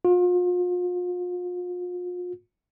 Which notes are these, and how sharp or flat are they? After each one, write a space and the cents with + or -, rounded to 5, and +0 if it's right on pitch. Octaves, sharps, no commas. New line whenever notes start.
F4 +40